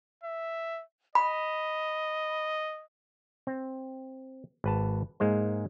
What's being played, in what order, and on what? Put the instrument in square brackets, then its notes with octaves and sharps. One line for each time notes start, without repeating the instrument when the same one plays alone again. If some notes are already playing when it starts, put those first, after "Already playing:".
[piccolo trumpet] E5
[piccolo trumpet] D#5 [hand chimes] B5
[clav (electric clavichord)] C4
G#1 B4 A5
G#2 G#3 A#3 C5